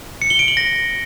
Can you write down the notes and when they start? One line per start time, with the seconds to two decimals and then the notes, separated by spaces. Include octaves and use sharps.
0.22 C#7
0.30 G7
0.39 D7
0.48 F#7
0.57 A#6